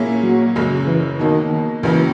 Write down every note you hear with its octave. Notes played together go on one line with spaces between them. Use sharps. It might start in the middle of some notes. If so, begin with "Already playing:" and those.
Already playing: A#2 A#3 C#4 E4 G#4
F#3
F#2 C#3 G#3
E3
B2 D#3 F#3 A#3
C#2 C#3 E3 F#3 A#3